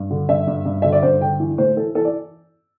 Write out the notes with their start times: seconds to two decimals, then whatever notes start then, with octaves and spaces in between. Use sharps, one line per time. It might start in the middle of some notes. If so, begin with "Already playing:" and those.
Already playing: G2
0.10 D3
0.29 G2 E5
0.47 G2
0.66 G2
0.82 D3 E5
0.92 D5
1.03 G2 C5
1.21 D3 G5
1.40 E3
1.58 A2 C5
1.77 E3 A4
1.95 E3 A4
2.05 D5